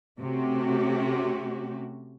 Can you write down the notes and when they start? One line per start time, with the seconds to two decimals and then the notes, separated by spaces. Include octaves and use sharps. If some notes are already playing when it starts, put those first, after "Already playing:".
0.19 C3 A3 C#4 F#4 G4